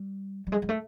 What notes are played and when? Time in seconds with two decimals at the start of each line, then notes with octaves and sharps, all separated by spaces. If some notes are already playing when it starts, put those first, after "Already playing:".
Already playing: G3
0.47 G3
0.52 G#3
0.62 G#3
0.69 A3